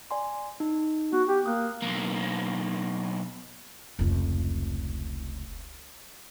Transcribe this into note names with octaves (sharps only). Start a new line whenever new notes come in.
D5 G#5 C6
D#4
B3 F#4
G4
A#3 D#6 F#6
B1 A#3
F1 C#2